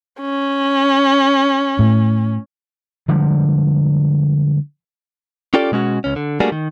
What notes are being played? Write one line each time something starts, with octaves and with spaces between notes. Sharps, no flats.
C#4
A2
D3 F3 G3 G#3
C#4 F4 G4 A4 D5
B2 G#3 C#4 F#4
C#2 C#4
D3
G3 A3 A#3 D4 F#4 G#4
D#3